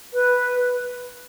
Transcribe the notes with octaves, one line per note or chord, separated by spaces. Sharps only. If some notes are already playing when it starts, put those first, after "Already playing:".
B4